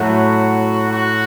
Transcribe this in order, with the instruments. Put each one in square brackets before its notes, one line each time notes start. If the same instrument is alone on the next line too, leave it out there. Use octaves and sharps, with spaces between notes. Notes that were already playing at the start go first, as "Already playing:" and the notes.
Already playing: [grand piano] A2 F#3 A3 [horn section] F#4
[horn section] F#4